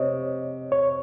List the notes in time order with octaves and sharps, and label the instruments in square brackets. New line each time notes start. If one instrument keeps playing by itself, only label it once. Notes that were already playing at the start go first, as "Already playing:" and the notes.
Already playing: [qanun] C3 [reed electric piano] C#5 D#5
[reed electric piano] C#5